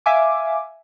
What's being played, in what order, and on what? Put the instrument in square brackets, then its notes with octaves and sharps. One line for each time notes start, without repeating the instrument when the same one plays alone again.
[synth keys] E5 F5 G#5 D6